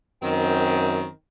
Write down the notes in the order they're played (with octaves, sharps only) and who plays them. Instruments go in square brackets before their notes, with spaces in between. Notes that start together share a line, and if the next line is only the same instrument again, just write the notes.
[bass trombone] F#2 [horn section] D#3 C4